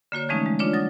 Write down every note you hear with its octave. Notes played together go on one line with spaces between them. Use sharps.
D3 A#3 F#4 C#5
E3 F3 G#3 A3 C#4 D#4
G#3
D4 F4 C#5 D5
F#3 D#6 A#6